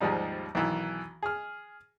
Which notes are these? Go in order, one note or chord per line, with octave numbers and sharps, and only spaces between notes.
D#2 G#2 F3 G3 D#4
B1 D#3 E3
G#4 F6